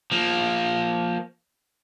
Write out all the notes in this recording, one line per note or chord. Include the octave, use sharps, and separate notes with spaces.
F3 A#3